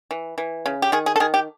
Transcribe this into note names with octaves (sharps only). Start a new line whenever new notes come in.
E3
E3
C#3
G4
D#3 G#4
G#4
A4
D#3 G#4
G4